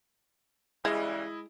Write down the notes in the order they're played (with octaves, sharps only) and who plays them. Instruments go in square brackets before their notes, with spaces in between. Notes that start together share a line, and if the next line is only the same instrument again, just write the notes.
[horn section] C#3 E3 G3 [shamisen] G#3 [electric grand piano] E4 D#5